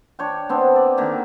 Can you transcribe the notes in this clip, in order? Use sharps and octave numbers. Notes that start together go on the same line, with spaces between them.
D4 C#5 G5
B3 C4 D4
D5
D3 D#3 A#3